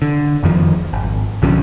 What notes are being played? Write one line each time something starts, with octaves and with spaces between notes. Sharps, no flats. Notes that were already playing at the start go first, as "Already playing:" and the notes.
D3
F#1 F2 D#3 F3
G#1
B1 D3 F3 C#4